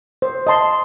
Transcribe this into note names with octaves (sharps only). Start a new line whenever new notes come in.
C5
D#5 A5 C6